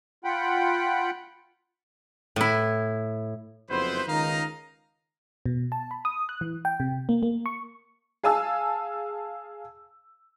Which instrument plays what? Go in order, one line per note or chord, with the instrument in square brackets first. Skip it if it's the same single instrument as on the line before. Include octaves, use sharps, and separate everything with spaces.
[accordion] F4 F#5 G5 B5
[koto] A2 E4
[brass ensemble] F#1 F2 B3 E4 B4 C5
C#2 D#3 D#4 D#5 F5 A#5
[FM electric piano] B2
A5
B5
D#6
F#6
E3
G5
C3
A#3
A#3
C#6
[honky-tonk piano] G#4 F5 G#5 A5 E6